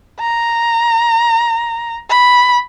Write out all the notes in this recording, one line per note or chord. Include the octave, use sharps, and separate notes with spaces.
A#5
B5